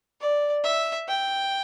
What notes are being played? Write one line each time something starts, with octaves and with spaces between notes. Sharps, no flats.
D5
E5
G5